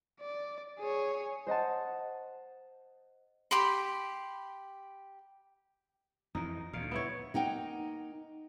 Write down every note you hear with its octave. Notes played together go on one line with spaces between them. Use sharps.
D5
G#4 C#5
C5 D#5 F#5 A5
G4 B5 C6
F2 E3 D#4
D2 A#2 F5
B3 E4 C#5
A#3 D#4 F#5 G5